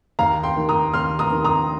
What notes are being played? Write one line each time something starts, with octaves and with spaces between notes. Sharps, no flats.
D#2 F5 A#5
G5 C6
D#3 A#3
A#5 D#6
D#2 C6 F6
A#5 D#6
D#3 A#3
A#5 D#6